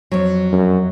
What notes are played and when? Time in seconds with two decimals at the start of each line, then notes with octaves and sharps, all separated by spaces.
0.12 F2 F#3
0.52 F#2